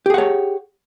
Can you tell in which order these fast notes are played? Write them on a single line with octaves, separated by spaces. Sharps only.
G4 G#4 F#5 C#5